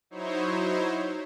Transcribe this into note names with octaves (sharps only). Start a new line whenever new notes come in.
F#3 D#4 E4 C5 C#5